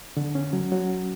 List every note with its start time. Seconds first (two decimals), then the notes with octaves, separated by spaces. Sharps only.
0.17 D3
0.35 C#4
0.53 F#3
0.72 F#3